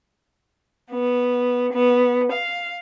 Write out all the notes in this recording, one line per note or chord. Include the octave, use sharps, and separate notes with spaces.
B3
B3
F5